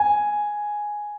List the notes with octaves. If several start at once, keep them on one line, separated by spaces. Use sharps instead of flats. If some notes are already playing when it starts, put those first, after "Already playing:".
Already playing: G#5